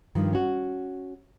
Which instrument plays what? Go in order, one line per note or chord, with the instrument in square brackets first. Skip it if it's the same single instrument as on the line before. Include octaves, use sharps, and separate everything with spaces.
[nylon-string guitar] G2 D#3 F3
C#4 F#4